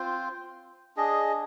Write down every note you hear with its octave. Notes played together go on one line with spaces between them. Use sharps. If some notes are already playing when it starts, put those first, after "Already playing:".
Already playing: C4 F4 C5
D4 G#4 D#5